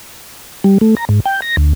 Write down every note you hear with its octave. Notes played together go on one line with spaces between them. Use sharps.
G3
A3
A#5
G#2
G5
A#6
D2